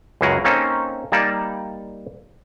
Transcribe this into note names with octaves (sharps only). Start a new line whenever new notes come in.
C#2 F#2 E4 F#4 G#4 A#4
A#3 C4 C#4 D#4 A4
G3 A#3 D#4 D5 A5